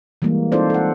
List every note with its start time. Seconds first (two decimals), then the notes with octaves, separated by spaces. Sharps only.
0.22 E3 G3 G#3 A#3
0.52 C4 D#4 F4 A4 C5 D5
0.70 A4 F#5